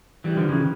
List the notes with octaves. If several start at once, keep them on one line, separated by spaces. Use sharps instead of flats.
E3 G3
D3 F3
C#3 E3